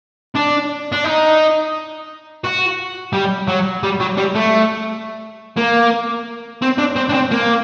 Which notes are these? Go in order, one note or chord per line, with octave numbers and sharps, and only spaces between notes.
D4
D4
D#4
F#4
G3
F#3
G3
F#3
G3
A3
A#3
C4
D4
C4
D4
C4
A#3